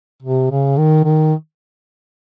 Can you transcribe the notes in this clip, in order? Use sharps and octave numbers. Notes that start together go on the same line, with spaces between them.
C3
C#3
D#3
D#3